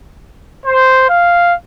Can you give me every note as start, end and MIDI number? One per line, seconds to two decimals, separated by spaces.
0.65 1.06 72
1.08 1.54 77